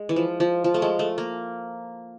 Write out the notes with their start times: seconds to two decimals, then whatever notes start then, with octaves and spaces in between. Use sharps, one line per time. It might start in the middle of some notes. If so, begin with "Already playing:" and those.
Already playing: G#3
0.09 E3
0.16 F3
0.40 F3
0.64 F3
0.74 A3
0.82 G#3
0.99 A3
1.18 A#3